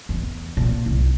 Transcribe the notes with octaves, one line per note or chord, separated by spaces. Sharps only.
E2
A#2
C2